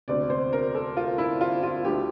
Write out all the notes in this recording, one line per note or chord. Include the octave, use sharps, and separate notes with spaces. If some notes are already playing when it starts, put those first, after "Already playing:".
E1 D2 C3 D5
C5
A#4
A4
F4
E4
F4
F4
D2 D3 F3 G4